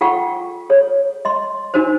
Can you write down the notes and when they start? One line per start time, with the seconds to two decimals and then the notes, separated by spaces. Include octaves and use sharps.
0.01 F4 A4 F#5 G5 C#6
0.70 A4 C#5
1.25 D#5 C6
1.74 D4 D#4 F#4 A#4 C5